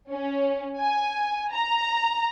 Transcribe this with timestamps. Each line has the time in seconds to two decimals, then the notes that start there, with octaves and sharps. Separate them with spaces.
0.12 C#4
0.79 G#5
1.52 A#5